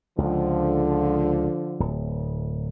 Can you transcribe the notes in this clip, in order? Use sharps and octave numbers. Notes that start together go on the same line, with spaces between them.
C#2 D3 F3
D1